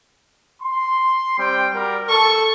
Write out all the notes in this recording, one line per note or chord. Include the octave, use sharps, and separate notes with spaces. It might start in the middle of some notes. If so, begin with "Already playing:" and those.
C6
G3 C4 G5
G3 F#4 A#4
A4 C#6